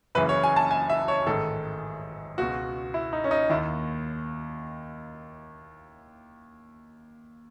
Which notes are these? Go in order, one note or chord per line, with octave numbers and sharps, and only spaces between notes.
F#1 F#2 C#3 E3 B4
C#5
G#5
A5
G#5
E5
C#5
A1 G#2 D#3 A4
C#2 B2 F#4
E4
D#4
C#4
D#4
D#2 D#3 E4